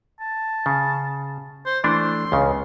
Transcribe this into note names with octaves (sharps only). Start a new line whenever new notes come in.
A5
C#3
C5
E3 A3 D4 C6
C#2 C#3